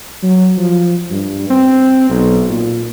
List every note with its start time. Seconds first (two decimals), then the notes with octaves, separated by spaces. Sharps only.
0.23 F#3
0.57 F3
1.10 G2
1.50 C4
2.09 B1
2.49 A#2